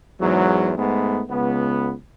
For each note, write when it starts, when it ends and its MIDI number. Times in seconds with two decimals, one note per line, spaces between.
0.20 0.71 40
0.20 0.71 44
0.20 0.71 54
0.77 1.22 44
0.77 1.22 57
0.77 1.22 59
1.29 1.93 37
1.29 1.93 59